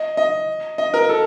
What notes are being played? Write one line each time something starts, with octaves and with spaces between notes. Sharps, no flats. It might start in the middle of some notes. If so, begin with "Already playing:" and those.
Already playing: D#5
D#5
D#5
A#4
A4